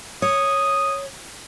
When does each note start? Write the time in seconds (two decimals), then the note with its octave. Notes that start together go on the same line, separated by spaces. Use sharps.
0.22 C#5 D#6